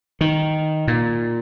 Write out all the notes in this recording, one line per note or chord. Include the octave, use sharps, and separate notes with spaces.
D#3
A#2